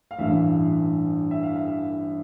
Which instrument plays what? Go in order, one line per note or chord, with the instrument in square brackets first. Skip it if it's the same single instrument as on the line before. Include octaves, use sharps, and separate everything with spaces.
[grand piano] F5
A1 G2 E3 E5
E5
F5
E5